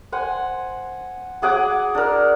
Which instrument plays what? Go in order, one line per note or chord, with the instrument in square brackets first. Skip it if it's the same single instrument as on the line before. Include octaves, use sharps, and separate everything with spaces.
[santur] C5 F#5 G#5
F#3 G#4 F#5 D6
D4 A#4